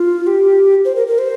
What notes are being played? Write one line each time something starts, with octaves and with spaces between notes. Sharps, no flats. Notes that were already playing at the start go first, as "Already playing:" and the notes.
Already playing: F4
G4
C5
A#4
A#4
C5